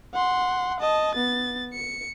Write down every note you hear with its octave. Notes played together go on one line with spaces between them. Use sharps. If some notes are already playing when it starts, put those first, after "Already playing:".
F#5 C6
D#5 A5
B3 A6
C#7